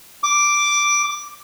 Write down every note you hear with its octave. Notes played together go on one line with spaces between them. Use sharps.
D6